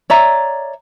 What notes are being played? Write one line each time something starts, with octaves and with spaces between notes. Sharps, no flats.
C#5 D5 E5 A#5